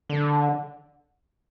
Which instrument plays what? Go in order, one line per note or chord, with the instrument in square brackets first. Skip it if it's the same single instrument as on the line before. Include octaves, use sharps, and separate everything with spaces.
[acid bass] D3